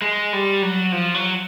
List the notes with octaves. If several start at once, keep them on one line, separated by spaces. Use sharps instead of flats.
G#3
G3
F#3
F3
F#3